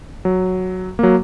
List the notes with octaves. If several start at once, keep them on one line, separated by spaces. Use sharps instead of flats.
F#3
F#3 A#3